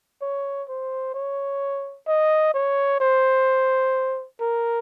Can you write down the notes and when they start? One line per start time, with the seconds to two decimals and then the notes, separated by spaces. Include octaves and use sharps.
0.21 C#5
0.68 C5
1.14 C#5
2.07 D#5
2.54 C#5
3.00 C5
4.41 A#4